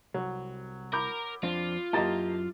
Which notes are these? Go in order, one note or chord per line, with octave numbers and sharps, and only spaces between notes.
C2 F#3
A#4 B5 D6 G6
F2 C4 D4 F4
F#2 A#3 E4 G4 D#5 A5 A#5 A6